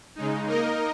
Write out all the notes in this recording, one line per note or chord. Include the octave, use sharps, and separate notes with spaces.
C#3 G#3 D#4
A#3 D#4 A#4 D#5